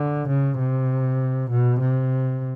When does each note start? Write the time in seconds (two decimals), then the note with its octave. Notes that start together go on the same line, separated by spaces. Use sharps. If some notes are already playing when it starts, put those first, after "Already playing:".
Already playing: D3
0.29 C#3
0.59 C3
1.51 B2
1.81 C3